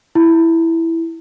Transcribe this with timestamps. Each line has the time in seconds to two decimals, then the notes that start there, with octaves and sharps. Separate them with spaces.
0.15 E4